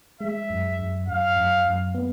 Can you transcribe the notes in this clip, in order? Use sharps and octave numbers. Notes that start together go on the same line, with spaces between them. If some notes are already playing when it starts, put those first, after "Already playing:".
G#3 E5
F#2
F#2
F#2 F5
F#2
F#2
B3